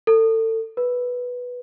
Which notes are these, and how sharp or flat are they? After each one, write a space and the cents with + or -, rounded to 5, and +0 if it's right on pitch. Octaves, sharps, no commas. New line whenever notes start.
A4 +30
B4 -5